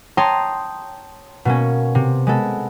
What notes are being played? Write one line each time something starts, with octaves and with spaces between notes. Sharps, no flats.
C#5 G5 A5 A#5 C6 D#6
B2 A#3 C#4
C3
G#3 B3 A4